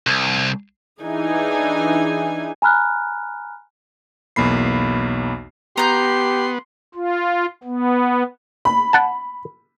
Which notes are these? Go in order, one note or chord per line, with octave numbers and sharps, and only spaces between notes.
C2
E3 D4 D#4 G#4 G#5
G#5 A#5 B5 F6 F#6
B1 E2 A#3 B5 C7
B3 G4 A#5 C6 G6
F4
B3
B5
F#5 A5